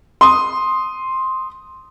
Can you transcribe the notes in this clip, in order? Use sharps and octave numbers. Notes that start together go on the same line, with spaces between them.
C6 D#6